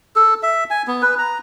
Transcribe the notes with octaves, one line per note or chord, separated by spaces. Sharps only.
A4
E5
G#5
B3
B4
A#5